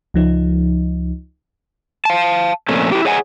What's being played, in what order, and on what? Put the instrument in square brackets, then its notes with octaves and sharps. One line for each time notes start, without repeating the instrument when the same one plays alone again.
[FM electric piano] C#2 F3 D#4
[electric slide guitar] F5 A5
F2 A#2 A3 C#4
E4 G4
G#4 C#5 D#5 F#5 G#5